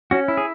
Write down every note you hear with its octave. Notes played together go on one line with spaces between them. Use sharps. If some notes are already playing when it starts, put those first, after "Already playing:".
C#4 F#4
E4
G#4